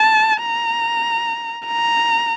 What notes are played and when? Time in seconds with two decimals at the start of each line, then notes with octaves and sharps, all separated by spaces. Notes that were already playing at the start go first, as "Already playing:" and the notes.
Already playing: A5
0.42 A#5
1.67 A#5